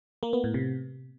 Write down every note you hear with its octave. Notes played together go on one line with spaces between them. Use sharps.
A#3
B3
A2
C3